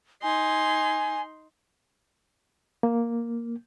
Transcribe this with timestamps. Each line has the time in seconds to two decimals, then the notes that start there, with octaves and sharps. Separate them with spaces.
0.23 D#4 G#5 C6
2.83 A#3